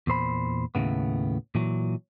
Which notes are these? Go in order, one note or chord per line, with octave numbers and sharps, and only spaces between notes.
E2 A#2 C5 B5
D#2 A2 C#3 B3
A#2 E3 F#3